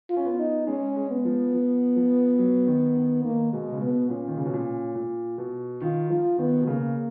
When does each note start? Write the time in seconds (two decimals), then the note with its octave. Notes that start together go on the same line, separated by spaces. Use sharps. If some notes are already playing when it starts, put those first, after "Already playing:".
0.10 F4
0.16 C#4
0.25 B3
0.39 D#4
0.67 G#3 C#4
0.96 G#3
1.11 B3
1.25 F3
1.54 F3
1.96 F3
2.39 F#3
2.67 D#3
2.96 D#3
3.24 D#3 A#3
3.53 B2 G#3
3.73 C#3
3.81 B2 B3
4.10 A#2 C#4
4.28 D#3
4.37 C#3
4.45 B2
4.53 A#2
4.95 A#2
5.38 B2
5.81 D#3 F4
6.10 F3 F4
6.38 D#3 B3
6.61 B2
6.67 C#3 A#3